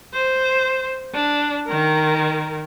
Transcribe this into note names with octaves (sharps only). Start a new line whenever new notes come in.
C5
D4
D#3 A#4